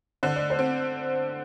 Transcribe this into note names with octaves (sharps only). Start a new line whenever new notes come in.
D3 C5
D5
C5
C4